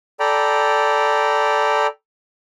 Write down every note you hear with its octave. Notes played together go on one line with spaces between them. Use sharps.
A4 D5 G5 A#5 B5